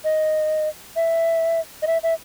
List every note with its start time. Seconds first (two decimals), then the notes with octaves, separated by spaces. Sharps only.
0.04 D#5
0.96 E5
1.82 D#5
1.87 E5
2.03 E5